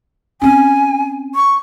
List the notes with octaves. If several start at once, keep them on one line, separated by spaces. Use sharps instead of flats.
C4 C#4 G#5
C#6